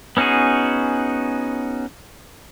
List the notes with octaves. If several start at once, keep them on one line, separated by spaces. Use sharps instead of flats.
B3 C#4 D#4 F#4 G#4